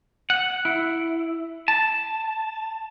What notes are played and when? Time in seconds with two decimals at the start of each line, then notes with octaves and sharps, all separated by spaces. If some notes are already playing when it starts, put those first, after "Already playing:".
0.30 F#5
0.65 E4
1.68 A5